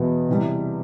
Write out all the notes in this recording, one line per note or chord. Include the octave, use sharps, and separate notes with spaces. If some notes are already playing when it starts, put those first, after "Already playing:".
Already playing: E2 B2 B3 E4
C3 E3 G3